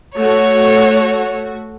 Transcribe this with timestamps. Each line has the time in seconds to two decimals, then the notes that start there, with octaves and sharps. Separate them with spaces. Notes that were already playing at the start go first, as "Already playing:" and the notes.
0.16 A3 F#4 C#5